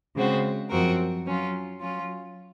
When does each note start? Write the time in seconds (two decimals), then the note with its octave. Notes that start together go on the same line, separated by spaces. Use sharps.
0.16 C#3 G#3 C4 F#4
0.70 F#2 F3 C4 F#4 A#4
1.26 F#3 C#4 F4
1.81 F#3 C#4 F4